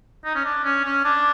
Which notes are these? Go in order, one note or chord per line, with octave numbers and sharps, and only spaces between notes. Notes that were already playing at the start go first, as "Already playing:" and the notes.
D#4
C#4
D4
C#4
C#4
D4